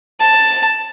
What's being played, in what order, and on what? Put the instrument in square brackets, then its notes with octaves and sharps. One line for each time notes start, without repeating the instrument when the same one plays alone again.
[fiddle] A5